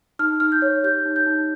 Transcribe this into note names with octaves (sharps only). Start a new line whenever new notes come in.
D#4 F6
D#4 F6
G6
C#5
G4 G6
D#4
G6
D#4